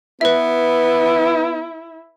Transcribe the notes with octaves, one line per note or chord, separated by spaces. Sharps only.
B3 E4 B4 E5